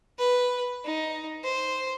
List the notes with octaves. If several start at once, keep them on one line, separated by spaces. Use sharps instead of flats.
B4
D#4
C5